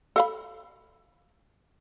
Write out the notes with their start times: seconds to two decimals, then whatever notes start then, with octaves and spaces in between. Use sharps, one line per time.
0.16 A4 F5 B5